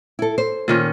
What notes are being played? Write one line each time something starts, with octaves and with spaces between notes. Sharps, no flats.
E4 A4
C5
A#2 D#3 C#4